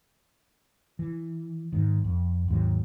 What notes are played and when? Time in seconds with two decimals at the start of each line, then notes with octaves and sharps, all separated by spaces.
0.99 E3
1.72 G#2 D#3
2.04 F2
2.48 D#2 G#2 F#3